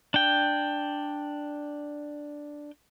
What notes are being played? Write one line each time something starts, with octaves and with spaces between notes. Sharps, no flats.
D4 G5